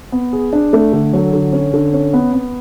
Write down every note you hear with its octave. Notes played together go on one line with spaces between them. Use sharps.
B3
G#4
D4
A3
D3
F#3
D3
C#4
D3
C#4
B3
B3